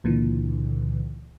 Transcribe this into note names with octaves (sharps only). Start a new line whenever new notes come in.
C#2 A#2 D3 E3